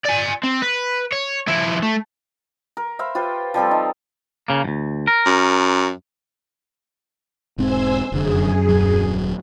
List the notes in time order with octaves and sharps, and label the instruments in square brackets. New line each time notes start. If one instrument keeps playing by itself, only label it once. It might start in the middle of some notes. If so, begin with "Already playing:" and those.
[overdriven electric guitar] D5 G#5
C4
B4
C#5
F3 E4
A3
[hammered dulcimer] A#4
C5 E5 F5 B5
F4 G4 B4 C5
F3 G3 C4 A4
D#4
[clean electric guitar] C#3 A#3
D2 G2
A#4
[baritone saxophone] F#2
[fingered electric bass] E1 G#2 C4 [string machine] C5 G#5 E6
[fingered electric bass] F1 D3 [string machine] F#2 G#4
[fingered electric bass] D#1 F#3